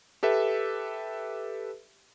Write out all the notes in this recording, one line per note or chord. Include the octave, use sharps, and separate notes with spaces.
G4 A4 B4 E5